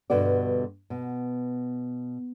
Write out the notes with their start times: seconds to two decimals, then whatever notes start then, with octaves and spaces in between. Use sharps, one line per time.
0.10 G2 B2 D3 F#4 D5
0.90 B2